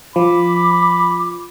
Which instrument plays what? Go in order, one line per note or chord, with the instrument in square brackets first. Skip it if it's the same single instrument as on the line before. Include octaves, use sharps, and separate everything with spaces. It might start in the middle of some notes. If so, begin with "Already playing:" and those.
[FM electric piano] F3 [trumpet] B5 [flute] D6